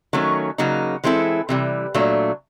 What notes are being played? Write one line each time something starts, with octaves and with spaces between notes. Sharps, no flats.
D#3 F#3 A3 C#4
C#3 F#3 A#3 D#4
E3 G#3 C4 E4 A4
C3 E3 G3
A#2 F#3 A3 D4